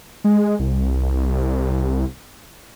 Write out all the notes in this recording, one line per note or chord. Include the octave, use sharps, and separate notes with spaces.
G#3
C2